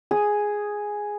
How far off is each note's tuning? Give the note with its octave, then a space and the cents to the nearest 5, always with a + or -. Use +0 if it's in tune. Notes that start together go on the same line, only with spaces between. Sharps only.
G#4 +0 D#6 +0